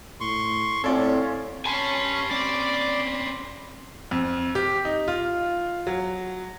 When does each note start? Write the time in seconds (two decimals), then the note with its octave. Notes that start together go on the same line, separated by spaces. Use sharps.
0.21 A2 C6 C#6
0.84 A2 C4 C#4 F4 A4 C#5 D5
1.66 C#4 G4 G#5 A5 B5 C6
2.31 C4 C#4 D5
4.11 F2
4.55 G4
4.85 D#4
5.08 F4
5.87 F#3